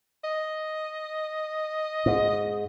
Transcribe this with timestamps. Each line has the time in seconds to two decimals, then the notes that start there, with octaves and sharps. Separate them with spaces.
0.24 D#5
2.06 G#2